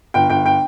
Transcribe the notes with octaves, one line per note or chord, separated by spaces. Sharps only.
G1 G5
G1 G5
G5